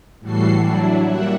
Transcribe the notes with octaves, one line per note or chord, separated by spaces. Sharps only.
A2 E3 G3 F#4 A4 C7
F#3 D4 E4 F#4
G3 A#3 E5 F#5